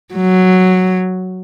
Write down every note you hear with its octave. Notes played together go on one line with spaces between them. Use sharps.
F#3